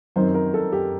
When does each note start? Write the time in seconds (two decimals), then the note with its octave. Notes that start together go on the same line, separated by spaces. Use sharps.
0.16 F#2 D#3 F#3 C4 D#4 C5
0.34 A#4
0.54 A4
0.72 G4